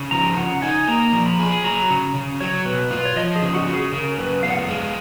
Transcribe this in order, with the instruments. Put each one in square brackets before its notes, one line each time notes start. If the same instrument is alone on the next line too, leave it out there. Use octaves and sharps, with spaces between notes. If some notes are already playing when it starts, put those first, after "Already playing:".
Already playing: [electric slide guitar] C#3
[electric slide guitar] F3 [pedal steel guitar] A#5
[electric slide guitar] C#3 [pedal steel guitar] F#5
[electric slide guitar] D#4 [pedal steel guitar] G#5
[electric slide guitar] A#3 [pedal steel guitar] A#5
[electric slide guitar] F3
[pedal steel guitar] B5
[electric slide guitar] G#4
[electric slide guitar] F#3 [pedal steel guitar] A#5
[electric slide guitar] C#3
C#3
[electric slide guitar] F#3 [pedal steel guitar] C#5
[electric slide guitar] B2 [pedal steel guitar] B4
[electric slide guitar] F4 [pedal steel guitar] B4
[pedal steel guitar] C#5
[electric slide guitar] F3 [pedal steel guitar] D#5
[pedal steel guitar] G#4
[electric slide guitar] C#3
[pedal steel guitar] F#4
[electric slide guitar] C#3
[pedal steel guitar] G#4
[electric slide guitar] C#3 [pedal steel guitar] A#4
[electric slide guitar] F#2 [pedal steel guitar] B4
[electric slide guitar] B3 [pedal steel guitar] F5
[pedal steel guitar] F#5
F5
[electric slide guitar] G#3